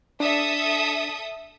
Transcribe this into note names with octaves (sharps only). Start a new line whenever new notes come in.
D4 A4 D5 E5 D#6